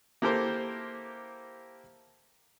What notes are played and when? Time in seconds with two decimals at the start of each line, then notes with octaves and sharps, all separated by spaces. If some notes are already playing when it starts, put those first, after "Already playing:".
0.22 A#3 E4 G4 A4 A#4 C5